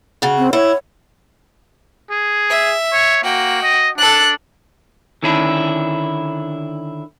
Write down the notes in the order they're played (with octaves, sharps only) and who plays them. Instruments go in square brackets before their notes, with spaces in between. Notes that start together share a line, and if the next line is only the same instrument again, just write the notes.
[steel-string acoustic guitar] C#3 F#4
[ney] C4
[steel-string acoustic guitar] E4 [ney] C#5
[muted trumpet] G#4
[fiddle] E5
[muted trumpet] C#5
[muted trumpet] A#3 [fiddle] F#4 G5
[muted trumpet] D#5
[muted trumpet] D4 [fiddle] A4 F#6
[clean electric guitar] D3 D#3 C#4 D4 E4